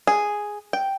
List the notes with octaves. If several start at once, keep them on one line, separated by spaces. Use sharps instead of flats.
G#4
G5